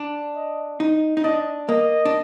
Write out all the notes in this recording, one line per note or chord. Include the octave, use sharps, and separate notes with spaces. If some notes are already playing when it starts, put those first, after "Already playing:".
Already playing: D4
D#5
D#4
D#4
D4 D#5
A#3 D#5
D4